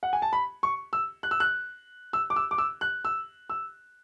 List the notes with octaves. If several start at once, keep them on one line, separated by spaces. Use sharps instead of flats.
F#5
G#5
A5
B5
C#6
E6
F#6
E6
F#6
E6
D6
E6
D6
E6
F#6
E6
E6